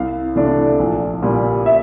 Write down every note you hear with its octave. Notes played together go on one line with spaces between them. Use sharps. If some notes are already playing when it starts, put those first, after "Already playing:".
Already playing: C2 F5
C3 E3 A3 D4
A#1
A#2 G3
E5